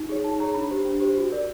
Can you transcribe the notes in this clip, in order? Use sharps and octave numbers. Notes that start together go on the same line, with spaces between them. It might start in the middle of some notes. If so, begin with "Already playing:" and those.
Already playing: D#4
G#4 C#5
D#4 A5
G#4 C#5 A#5
D4 B5
G4 C5
D4
G4 C5
F#4
A#4 D5